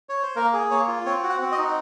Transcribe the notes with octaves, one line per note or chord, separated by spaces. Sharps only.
C#5
C5
A#3 A#4
G#4
A#3 C#5
F4
C4 C#5
F#4
F#5
C4
D#5
D#4